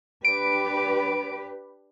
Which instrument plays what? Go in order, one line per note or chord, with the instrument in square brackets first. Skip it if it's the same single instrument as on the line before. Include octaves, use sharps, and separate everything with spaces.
[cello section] D4 G4 B4 [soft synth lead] D7